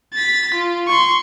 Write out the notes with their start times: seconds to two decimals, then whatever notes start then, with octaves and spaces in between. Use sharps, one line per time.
0.14 A6 B6
0.54 F4
0.88 C6 C#6